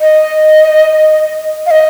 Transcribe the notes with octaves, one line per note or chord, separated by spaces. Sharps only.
D#5
F5
D#5